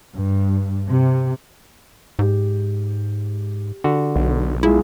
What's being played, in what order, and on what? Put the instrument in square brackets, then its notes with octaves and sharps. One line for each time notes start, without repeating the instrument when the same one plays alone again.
[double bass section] G2
C3
[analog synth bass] G#2 [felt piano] G4
[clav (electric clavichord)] D3 F#4
[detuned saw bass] B1
[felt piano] G#3 F4 G#4 [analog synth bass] E4